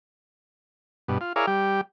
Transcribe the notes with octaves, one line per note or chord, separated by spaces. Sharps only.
G2 B2
F4
E4 G#4 A#4 C#5 D5 F5
G3 G4